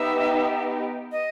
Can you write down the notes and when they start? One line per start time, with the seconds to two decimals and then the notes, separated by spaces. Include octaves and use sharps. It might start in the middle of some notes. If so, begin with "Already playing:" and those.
Already playing: B3 D#4 G4 E5
1.12 D#5